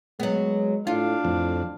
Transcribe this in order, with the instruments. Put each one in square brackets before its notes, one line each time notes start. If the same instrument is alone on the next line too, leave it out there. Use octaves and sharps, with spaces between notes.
[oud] F#3 B3 [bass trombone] G#3
[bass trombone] A2 [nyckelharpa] D4 F5 [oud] F4
[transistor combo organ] F2 [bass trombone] A2